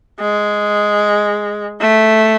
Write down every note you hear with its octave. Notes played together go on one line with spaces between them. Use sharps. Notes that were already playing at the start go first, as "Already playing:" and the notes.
G#3
A3